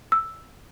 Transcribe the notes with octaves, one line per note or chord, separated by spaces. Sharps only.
E6